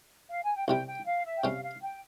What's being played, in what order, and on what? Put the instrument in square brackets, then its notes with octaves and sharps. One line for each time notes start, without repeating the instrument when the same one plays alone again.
[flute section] F5
G#5
G5
[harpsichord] C2 C3 G3 [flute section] G5
[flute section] G5
F5
E5
G5
[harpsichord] C3 G3 C#4 [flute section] F5
[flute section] F5
G5